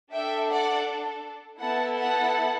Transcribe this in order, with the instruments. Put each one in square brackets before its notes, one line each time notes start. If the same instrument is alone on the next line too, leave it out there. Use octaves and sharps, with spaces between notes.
[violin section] D4 A4 E5 G5
D5 F#5
B3 E4 A4 F#5 A5
F#5 A5